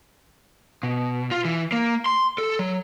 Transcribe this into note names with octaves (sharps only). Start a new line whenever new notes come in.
B2
F4
E3
A#3
C6
A4
F#3